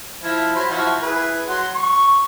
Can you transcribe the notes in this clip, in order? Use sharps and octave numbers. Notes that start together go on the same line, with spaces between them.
F3 E4
F#3 C5 B5
F3 E4 F#4
E4 G#4 B4
F#3 F#5 C6
C#6